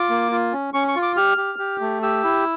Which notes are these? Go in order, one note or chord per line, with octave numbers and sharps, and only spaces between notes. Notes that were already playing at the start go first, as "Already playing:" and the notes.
Already playing: F4 D6
A#3
F4
C#4
C#4 C#6
C#6
F4
D6
G4 F6
G4
G4
A3
G4 E6
E4